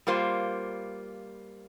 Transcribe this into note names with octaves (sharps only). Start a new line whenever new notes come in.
G3 A#3 F4 C5